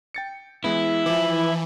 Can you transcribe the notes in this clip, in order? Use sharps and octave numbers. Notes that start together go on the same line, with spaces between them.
G5 A6 C#7
E3 G#3 B3 E4
E3 F3 E5 D6